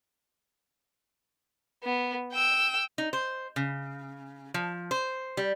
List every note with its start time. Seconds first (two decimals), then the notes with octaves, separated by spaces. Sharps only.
1.84 B3
2.33 G5 E6
2.98 D#4
3.13 C5
3.56 C#3
4.54 F3
4.91 C5
5.37 G3